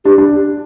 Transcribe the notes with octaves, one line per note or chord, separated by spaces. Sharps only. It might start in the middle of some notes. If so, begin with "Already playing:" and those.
D4 G4
D4